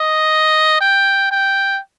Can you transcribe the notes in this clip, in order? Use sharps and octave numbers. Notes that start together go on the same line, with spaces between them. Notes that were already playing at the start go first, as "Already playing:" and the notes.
Already playing: D#5
G5
G5